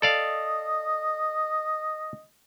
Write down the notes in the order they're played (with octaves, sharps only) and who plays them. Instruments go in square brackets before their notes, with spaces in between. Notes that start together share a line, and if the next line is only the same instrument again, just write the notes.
[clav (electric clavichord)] A4 D5 F5 [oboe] D#5